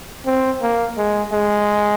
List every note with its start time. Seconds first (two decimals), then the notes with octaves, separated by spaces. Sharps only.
0.26 C4
0.62 A#3
0.97 G#3
1.33 G#3